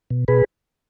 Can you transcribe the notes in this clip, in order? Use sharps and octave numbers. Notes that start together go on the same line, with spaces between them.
B2
B2 G#4 B4